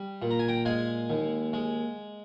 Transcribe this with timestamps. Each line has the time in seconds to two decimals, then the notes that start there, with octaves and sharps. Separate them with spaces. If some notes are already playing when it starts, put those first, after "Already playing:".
Already playing: G3
0.22 A#2
0.31 A#5
0.39 G#5
0.48 G5 A#5
0.65 G#3 F5 G#5
1.10 D#2
1.53 G#3